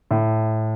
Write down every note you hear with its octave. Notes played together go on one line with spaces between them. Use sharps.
A2